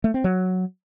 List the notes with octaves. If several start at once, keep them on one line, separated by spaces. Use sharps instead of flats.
A3
C4
F#3